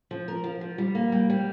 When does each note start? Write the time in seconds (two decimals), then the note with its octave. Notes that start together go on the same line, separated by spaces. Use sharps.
0.11 F3
0.28 A#4
0.44 F3
0.61 F3
0.78 G3
0.95 A#3
1.12 G3
1.30 G3